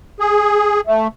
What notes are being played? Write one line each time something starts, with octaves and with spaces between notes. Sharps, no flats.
G#4
A3